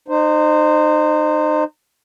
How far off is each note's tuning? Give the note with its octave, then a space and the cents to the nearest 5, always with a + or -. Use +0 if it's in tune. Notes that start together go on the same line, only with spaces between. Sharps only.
D#4 -30 C5 +0